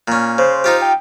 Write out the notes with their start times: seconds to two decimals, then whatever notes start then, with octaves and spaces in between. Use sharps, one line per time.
0.08 A#2 C#4
0.38 C#3 C5
0.64 D#4 F4 G4
0.82 G5